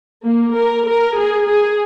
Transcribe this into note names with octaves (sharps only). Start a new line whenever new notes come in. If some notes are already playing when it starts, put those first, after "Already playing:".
A#3
A#4
A#4
G#4
G#4